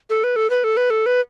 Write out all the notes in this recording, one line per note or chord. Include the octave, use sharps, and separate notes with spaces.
A4
B4
A4
B4
A4
B4
A4
B4